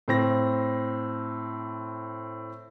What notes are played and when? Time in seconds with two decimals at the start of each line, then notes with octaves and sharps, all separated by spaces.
0.08 A2 C4 A#6